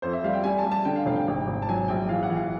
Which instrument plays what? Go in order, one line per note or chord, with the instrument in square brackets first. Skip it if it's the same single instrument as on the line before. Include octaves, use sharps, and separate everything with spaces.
[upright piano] F2 C5
E5
G3 F5
G5
G3 G#5
A5
G3
A5
D3 G5
F5
F1 F5
G5
G#1
G#1
A5
F#3 G#5
A#1 G5
E3 F5
F#5
E3
F5